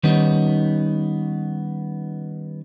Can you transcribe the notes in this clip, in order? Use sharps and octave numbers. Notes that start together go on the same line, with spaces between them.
D#3 G3 B3 C#4 D#4